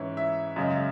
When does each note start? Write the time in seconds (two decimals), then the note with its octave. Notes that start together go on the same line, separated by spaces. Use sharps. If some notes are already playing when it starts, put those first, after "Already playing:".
Already playing: G#2 E3 C#4 E4
0.17 E5
0.56 F#2 C#3 G#3